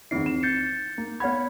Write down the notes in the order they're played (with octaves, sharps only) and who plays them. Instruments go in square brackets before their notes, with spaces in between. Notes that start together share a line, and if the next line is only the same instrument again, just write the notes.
[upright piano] E2 D#3 E4 [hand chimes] C4 C7
[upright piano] E7
[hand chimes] G6 A6 C#7
[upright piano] A#3
[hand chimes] B3 B5 [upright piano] C#5 F#5 G#6